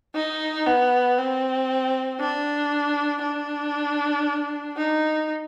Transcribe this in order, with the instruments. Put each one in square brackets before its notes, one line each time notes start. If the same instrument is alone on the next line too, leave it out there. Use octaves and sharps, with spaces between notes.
[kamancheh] D#4
B3
C4
D4
D4
D#4